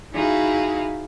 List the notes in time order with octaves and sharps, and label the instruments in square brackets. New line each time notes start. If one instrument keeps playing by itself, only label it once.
[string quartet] D#4 E4 F#4 G#4 F5